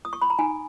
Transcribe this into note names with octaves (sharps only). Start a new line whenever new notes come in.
D#6
C#6
B5
A#5
D#4 G#5